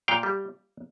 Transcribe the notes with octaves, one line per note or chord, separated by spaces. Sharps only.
A#2 F5 G5
G3